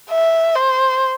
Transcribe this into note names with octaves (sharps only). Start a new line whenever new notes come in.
E5
C5